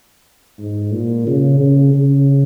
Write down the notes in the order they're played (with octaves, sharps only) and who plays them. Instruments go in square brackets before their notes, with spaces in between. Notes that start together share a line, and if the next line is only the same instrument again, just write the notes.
[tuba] G#2
A#2
C#3
C#3
C#3